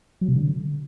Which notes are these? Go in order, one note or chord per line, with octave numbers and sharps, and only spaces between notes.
F#3
C3
D3